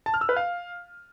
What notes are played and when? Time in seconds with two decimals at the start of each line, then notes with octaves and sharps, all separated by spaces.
0.06 A5
0.14 F6
0.21 E6
0.29 B4
0.36 F5